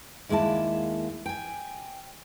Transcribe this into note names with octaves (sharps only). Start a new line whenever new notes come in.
D#2 G#3 A#3 E4 A5
G5 G#5